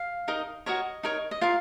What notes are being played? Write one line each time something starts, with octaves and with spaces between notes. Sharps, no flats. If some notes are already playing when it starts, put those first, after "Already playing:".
Already playing: F5
D#4 A#4 D#5
F#4 A#4 C#5 D#5
D#4 A#4 C#5
D#5
F4 A#4 F5